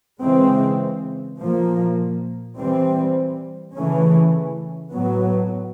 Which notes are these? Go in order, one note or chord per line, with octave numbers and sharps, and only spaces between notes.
C#3 E3 G#3 C4
A#2 F3 A#3
E3 G3 C4
C#3 E3 A3 C#4
A2 F#3 B3